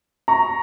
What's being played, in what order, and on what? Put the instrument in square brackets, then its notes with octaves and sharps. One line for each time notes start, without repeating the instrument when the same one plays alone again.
[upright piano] A#5 C#6